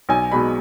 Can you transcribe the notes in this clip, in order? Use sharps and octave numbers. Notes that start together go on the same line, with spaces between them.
B1 G#5
B2 G#3 D#4 B5